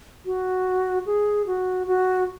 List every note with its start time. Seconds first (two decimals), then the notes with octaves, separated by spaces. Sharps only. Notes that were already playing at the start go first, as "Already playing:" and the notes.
0.26 F#4
1.06 G#4
1.47 F#4
1.87 F#4